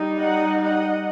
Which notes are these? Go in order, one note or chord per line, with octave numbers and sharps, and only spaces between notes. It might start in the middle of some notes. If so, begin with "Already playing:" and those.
Already playing: G3 D#4
D#5 F#5
D#5 F#5